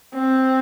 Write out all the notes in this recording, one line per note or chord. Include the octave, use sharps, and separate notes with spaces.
C4